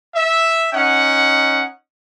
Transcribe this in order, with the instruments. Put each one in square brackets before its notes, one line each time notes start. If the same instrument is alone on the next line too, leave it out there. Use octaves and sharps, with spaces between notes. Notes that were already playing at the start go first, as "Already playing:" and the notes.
[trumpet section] E5
C#4 D#4 F#5